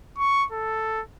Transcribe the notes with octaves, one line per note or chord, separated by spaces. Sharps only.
C#6
A4